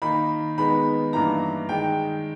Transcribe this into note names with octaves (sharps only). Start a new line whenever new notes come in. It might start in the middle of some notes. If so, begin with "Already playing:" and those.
D#3 A#3 D#4 B5
D#3 G#3 B3 D#4 B5
G2 E3 A#3 D#4 A#5
D#3 G#3 D#4 G5